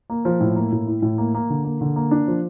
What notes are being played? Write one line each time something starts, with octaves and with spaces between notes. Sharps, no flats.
A#3
F3
A2
A#3
A2
E4
A2
A#3
A#3
D3
A#3
D3
A#3
D4
F3